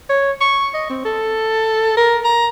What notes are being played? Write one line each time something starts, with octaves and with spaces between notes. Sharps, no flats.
C#5
C#6
D#5
C4
A4
A#4
A#5